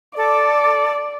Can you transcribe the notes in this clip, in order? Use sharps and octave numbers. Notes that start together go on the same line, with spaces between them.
A4 D5 D6